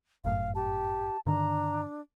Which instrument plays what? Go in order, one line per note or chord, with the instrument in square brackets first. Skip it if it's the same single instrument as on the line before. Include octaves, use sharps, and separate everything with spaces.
[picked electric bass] G1 F#2 A2 [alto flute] F5
[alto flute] G4 [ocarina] A5
[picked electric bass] G2 D3 D#3 [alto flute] D4 [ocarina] A#5